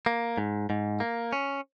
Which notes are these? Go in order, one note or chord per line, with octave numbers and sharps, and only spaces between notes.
A#3
G#2
G#2
A#3
C#4